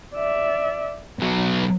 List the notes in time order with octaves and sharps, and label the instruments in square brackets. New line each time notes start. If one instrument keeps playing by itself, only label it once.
[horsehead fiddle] D5 E5
[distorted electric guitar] B1 F#3 [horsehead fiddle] B3